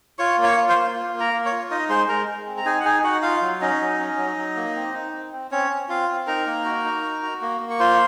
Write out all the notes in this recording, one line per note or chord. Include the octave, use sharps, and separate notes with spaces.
F4 C#5 C#6
A#3
C#5 C#6
F4
C5 C6
A#3
F4
A#3
A#4 A#5
A#3
C#5 C#6
F4
D#4 D#5 D#6
G#3 C5 C6
G#3 A#4 A#5
G#3
C4
A#5
D#4 G#4 G#5
F#5
D#4 G#4 G#5
D#4 F#4 F#5
F4 F5
F#3
C#4 D#4 D#5
F#3
C#4
F#3
F#3
A#3
C4
D#4
C4
C4
C4 C#4 C#5
C4
C4 F4 F5
C4
D#4 A#4 A#5
A#3
F#4
D#4
F#4
F#4
A#3
A#3
C#6
F4 C5 C6